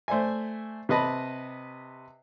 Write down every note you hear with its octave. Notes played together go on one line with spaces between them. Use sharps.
A3 C5 D5 E5 G#5
C3 B4 D#5 A5 B5